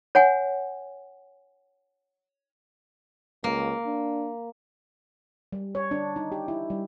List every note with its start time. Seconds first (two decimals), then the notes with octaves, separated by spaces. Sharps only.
0.15 C#5 F#5 G#5
3.44 C#2 A#3
3.86 D4
5.53 G3
5.75 C#5
5.91 D4
6.16 D#4
6.32 G4
6.48 E4
6.70 G3